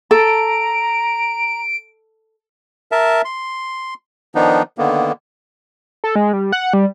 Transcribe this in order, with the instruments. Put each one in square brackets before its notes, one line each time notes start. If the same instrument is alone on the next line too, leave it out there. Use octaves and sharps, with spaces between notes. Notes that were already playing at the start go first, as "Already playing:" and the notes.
[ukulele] A4 [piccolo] A#5 [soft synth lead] D7
[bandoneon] A#4 E5 A5
C6
D#3 F3 B3 D4 D#4
D3 D#3 A#3 B3
[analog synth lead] A4
G#3
G3
F#5
G3